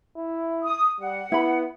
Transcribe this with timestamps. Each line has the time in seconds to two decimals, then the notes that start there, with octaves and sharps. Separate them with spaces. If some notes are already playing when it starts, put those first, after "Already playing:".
0.17 E4
0.64 D#6
1.00 G3 F#5
1.32 B3 E4 B5